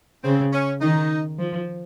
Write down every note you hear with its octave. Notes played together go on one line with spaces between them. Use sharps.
C#3 C4
C#4
D#3 D#4
F3